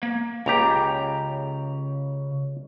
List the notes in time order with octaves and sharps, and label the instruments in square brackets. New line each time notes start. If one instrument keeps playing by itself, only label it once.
[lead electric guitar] A#3
[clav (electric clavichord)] C#2 G4 [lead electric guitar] C#3 A#5